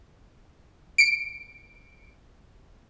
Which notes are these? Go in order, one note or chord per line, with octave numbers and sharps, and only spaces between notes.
C#7 D7